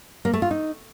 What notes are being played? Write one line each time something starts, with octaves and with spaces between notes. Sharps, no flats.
A#3
A3
F4
D#4